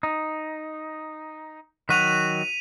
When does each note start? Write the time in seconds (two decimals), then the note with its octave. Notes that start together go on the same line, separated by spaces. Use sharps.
0.03 D#4
1.89 D#3 F#3 F#4 B6 D#7 F7